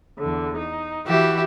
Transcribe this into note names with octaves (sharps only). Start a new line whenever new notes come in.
E2 D3
D#4
E3 F#4 G4 E5 B5